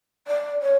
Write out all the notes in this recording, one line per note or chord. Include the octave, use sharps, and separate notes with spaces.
D5
C#5